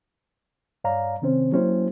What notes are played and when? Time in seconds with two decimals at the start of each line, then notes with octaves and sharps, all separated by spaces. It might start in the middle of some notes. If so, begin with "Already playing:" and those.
0.84 G2 C#5 D5 F5 A#5
1.22 C3 D#3 C4 C#4 C5
1.52 F#3 A#3 C#4 E4 G4 C5